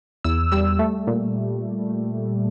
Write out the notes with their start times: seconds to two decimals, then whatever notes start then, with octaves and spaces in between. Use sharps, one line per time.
0.24 E2 E6
0.52 G3 E6
0.79 A3
1.07 A#2